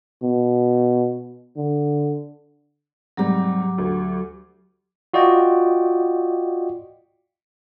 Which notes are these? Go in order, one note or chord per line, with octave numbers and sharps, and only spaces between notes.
B2
D3
G#2 C3 F#3 G3 G4 D6
D2
F4 F#4 D5 D#5 G5